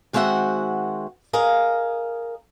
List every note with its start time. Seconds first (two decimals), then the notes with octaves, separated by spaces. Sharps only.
0.13 D#3 G#3 C4 F#4 E5 F#5
1.33 G#4 A#4 D#5 F5